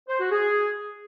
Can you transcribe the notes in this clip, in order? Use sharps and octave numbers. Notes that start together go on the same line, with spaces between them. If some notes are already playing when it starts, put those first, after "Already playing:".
C5
F#4
G#4